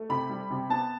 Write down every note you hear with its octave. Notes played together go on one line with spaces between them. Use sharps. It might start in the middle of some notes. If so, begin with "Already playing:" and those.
Already playing: A3
C3 B5
G3
C3
B3 A5